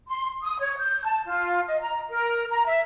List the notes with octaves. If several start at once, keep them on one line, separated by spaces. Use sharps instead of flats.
C6
D#6
C#5
G6
A5
F4
D#5
A#5
A#4
A#5
E5